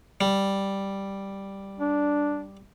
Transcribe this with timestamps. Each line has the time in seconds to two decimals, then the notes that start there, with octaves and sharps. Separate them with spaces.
0.21 G3
1.80 D4